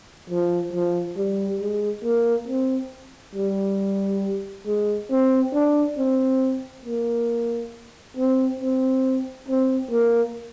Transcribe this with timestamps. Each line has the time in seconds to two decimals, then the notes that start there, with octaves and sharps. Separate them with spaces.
0.30 F3
0.73 F3
1.17 G3
1.61 G#3
2.04 A#3
2.48 C4
3.35 G3
4.67 G#3
5.11 C4
5.54 D4
5.98 C4
6.85 A#3
8.17 C4
8.60 C4
9.48 C4
9.91 A#3